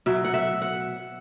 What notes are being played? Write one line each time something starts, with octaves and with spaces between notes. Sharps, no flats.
B2 F#3 E5
F#5
E5
F#5